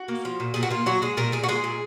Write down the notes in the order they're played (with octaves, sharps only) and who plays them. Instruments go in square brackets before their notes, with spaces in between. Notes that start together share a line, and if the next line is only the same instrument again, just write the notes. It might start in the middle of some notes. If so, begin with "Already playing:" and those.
Already playing: [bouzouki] F#4
A#3
F3
A#2
A#2 G#4
F#4
A#3 F4
F#3 F#4
G#3 G#4
A#2 A#4
A#2 G#4
F#4
G#3 G#4
A#2